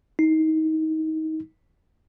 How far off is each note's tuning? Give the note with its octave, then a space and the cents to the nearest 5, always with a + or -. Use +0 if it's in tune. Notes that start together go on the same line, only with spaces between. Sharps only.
D#4 +25